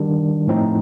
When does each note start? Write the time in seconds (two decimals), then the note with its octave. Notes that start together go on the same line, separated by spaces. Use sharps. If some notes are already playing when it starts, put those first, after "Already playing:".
Already playing: D#3 G3 D4
0.48 A2 F3 C4 D#4